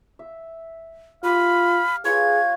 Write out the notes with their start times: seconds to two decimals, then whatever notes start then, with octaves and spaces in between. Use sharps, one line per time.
0.19 E5
1.24 F4 G4 F5 B5
2.05 F4 G#4 B4 C#5 G#6